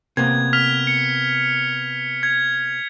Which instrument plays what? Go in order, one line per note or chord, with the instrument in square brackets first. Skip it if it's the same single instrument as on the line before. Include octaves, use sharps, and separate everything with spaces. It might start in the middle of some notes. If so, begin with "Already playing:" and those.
[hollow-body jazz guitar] C3 A#3 B3 [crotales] G#6
[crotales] F6 B6 F7
C#7
G#6